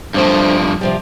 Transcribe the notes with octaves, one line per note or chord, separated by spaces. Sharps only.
G2 F3 A3 C4 D4
C3 F3 G3